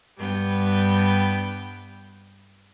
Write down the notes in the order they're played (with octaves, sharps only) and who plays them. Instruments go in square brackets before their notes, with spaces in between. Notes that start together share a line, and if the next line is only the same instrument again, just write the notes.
[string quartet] G2 G3 B3 G5